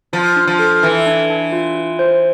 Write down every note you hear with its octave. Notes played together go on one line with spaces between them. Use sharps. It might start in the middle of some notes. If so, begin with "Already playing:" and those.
F3 F4
D4
F3
A4
E3 A4
D4
D4
F4
F4
C5